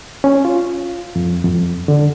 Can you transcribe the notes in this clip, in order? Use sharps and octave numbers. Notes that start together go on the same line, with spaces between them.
C#4
F4
F2
F2
D3